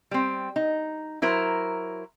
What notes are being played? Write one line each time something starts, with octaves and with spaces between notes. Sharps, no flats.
G3 C4
D#4
F#3 E4 A#4 C5